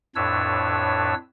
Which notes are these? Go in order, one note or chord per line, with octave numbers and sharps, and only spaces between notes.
F2 A2 D4 B4 C#5 E6